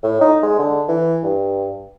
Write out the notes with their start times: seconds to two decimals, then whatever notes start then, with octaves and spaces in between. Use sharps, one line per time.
0.03 A2
0.21 D#4
0.42 G#3
0.59 D3
0.88 E3
1.23 G2